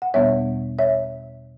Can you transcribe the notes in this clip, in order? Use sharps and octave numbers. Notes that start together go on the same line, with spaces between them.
F#5
E2 B2 G3 B3 C#5 E5
C#5 E5